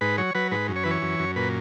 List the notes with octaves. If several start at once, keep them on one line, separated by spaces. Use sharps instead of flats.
G#2 B4
F#3 C#5
F#3 B4
G#2 B4
F#2
C#5
E3 B4
C#5
F#2
F#2
A#2 B4